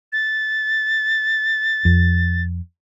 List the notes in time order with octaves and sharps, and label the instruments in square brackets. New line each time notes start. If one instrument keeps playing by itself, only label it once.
[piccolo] A6
[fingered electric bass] F2